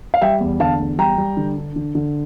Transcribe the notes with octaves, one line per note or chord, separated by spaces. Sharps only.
F5
G3 E5 G5
E2
D3 F5 A5
E2
G3 G5 A#5
G3
D3
D4
D3
D3